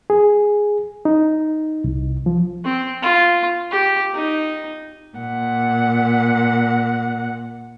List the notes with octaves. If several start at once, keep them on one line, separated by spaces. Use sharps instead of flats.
G#4
D#4
C2
F3
C4
F4
G4
D#4
A#2 F#5